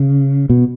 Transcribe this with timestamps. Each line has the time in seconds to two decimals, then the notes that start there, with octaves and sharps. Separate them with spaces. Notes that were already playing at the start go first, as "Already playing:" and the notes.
Already playing: C#3
0.50 B2